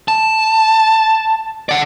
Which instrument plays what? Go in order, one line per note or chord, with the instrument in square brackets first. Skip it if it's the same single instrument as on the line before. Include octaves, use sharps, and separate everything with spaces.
[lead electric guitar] A5
D5 F#5